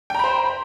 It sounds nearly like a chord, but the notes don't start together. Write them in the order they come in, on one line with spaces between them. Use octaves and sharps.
G5 A#5 B5 C5